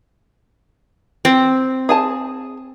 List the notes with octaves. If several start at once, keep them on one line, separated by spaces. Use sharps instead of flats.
C4
G#4 G#5 A5